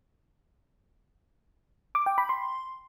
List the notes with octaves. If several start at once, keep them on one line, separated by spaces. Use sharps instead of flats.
D6
G5
B5
C6